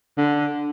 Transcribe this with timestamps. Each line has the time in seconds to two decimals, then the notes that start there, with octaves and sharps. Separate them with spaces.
0.18 D3